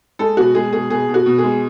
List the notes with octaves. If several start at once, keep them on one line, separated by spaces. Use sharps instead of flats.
G#3 A4
B2 F#4
G#3 G#4
B2 G#4
B2 G#4
B2
F#4
B2
G#4
G#3